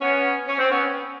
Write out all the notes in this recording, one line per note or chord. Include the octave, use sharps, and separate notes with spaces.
B3 C#4
C#4
C4
B3 C#4